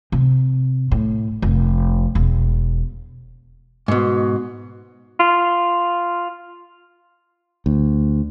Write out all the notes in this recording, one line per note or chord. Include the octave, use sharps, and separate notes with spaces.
C3
A2
F1
E1
G#2 B2
F4
D2